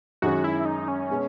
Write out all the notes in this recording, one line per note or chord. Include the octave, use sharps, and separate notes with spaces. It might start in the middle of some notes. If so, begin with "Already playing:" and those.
F#2 D#3 G#3 C#4 F#4
E4
D#4
C#4
B2 G#3 B3